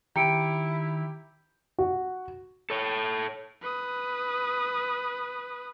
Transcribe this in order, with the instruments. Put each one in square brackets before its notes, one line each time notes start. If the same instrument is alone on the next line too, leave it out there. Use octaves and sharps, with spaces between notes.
[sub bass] D#3 [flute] E4 [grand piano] G4 [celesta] A#5 C#7 D7
[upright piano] F#4
[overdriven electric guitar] A4 C#5
[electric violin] B4 D#6